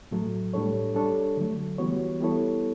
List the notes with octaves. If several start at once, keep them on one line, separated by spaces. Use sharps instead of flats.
A2 F#3 A3
A2 G3 D4 A4 C#5
G3 D4 A4 C#5
D3 F#3 A3
E3 G3 B3 F#4 C#5
G3 B3 E4 A4 C#5